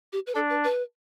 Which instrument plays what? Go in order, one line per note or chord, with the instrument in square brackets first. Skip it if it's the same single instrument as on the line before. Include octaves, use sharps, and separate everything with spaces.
[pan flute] G4
B4
[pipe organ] D4 [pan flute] A4
[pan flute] B4
B4